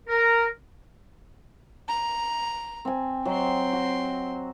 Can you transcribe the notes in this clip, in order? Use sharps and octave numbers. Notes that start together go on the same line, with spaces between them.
A#4
A#5
C4 G#5
F#3 C4 D#5 C6
F#4